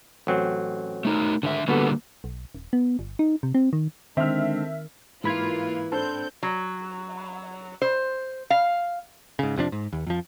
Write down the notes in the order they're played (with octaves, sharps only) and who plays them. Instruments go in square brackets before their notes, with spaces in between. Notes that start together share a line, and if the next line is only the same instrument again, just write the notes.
[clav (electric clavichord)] A1 F#3 C4
[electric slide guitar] A3 D#4 A#4
[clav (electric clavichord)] G#1 [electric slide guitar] D3 E5
[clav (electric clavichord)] B2 B3 A4 [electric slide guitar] D3 G3 A#3
[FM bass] B1
D#1
B3
G1
D#4
C3
C4
D#3
[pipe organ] D3 G#3 D4 [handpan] D#3 [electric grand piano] C4 [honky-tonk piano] E5 F6
[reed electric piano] G#2 B5 G#6 [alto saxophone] E3 [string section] A#3 F4
[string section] C4 G6 [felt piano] D4 A4 C5
[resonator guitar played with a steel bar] F#3
C5
F5
[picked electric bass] G#2 C#3
F1 C3 F3 D4
G#2
D#2
F2 F3